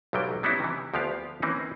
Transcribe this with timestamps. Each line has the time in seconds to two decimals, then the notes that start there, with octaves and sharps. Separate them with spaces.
0.13 B1 G#2 F#3 G3 G5
0.43 F#3 G3 B3 C#4 D#4 E4
0.60 C3 E3
0.94 D2 F3 B3 G4 F5
1.42 E3 A#3 C4 C#4 D#4